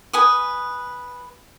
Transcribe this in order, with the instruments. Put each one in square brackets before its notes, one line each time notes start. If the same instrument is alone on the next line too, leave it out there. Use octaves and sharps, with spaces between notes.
[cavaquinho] B4 G#5 D#6